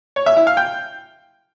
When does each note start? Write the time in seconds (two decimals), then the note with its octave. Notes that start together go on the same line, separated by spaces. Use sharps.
0.16 C#5
0.26 E5
0.37 E4
0.47 F5
0.57 G5